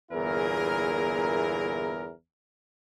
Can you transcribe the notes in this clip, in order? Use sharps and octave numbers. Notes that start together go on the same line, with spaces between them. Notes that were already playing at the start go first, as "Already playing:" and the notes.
G1 E2 A#2 E4 G#4 A#4